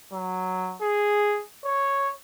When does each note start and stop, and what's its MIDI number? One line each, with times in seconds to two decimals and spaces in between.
0.13 0.76 54
0.82 1.42 68
1.65 2.09 73